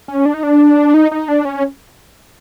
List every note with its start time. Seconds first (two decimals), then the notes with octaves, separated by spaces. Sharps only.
0.08 C#4
0.26 D4
0.34 D#4
0.43 D4
0.94 D#4
1.11 D#4
1.28 D4
1.45 C#4